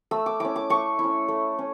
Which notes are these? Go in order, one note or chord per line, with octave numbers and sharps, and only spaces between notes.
A3 E6
D6
C#4 E4 D6
D6
A3 C#6
C#4 E4
A3
C#4